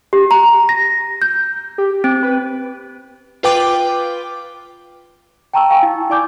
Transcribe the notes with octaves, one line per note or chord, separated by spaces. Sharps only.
G4
A#5
A#6
G6
G4
C4
B4
F4 B4 G5 D6
G5 A5 A#5 C#6 E6
F5 G5 G#5 C#6
E4
E4 D5 G#5 D6 G6